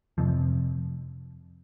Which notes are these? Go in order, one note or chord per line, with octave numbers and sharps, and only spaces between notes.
F2 C3 F3